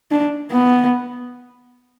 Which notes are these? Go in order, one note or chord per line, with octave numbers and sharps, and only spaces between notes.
D4
B3